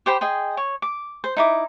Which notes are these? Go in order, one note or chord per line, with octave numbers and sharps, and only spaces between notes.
G4 C5 G5 B5
G#4 D#5 G5 C6
C#5
D6
C5
D#4 E4 D6